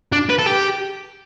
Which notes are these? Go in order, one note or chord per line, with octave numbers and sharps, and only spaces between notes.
D4
B4
A4
G4